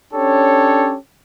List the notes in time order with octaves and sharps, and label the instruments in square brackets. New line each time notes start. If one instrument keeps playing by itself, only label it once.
[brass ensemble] C#4 D4 G4 A4 C#5